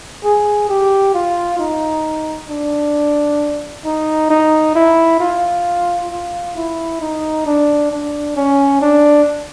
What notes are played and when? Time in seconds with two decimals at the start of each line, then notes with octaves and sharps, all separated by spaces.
0.24 G#4
0.69 G4
1.14 F4
1.59 D#4
2.49 D4
3.85 D#4
4.30 D#4
4.75 E4
5.20 F4
6.11 F4
6.56 E4
7.01 D#4
7.46 D4
7.91 D4
8.36 C#4
8.81 D4